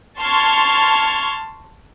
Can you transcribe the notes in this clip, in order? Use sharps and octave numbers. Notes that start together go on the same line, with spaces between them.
A5 C6 C#6 F6 G#6